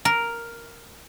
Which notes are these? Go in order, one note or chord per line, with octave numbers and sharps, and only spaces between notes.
A#4